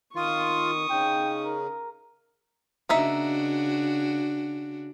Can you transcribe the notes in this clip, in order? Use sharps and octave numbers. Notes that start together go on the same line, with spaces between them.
D#3 F4 C#6 D#6
C#3 D#4 G5
A#4
C#3 A#3 D4 D#4 F#4 E5